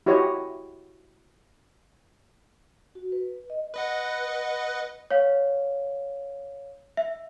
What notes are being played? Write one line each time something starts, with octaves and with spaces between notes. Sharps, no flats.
E4 F#4 G4 C#5 D#5
F#4
B4
D#5
B4 D#5 F#5
C#5 F5
E5